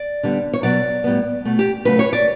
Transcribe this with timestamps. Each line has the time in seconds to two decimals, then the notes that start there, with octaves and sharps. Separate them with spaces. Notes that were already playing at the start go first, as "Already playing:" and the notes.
Already playing: D5
0.23 D3 G3 B3
0.54 C#5
0.63 B2 F#3 B3 D5
1.04 A2 G3 B3
1.45 B2 A3
1.59 G4
1.85 C#3 F#3 A3 B4
1.99 C#5
2.13 D5